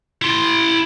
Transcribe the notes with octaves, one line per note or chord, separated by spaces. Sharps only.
E4 C6